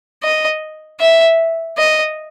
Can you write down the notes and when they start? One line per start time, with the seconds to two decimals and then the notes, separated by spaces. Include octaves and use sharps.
0.23 D#5
1.00 E5
1.78 D#5